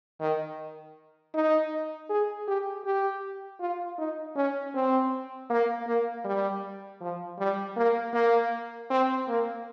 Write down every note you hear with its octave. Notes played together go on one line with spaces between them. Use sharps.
D#3
D#4
G#4
G4
G4
F4
D#4
C#4
C4
A#3
A#3
G3
F3
G3
A#3
A#3
C4
A#3